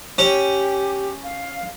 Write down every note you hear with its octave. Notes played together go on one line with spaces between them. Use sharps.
C#4 G4
F5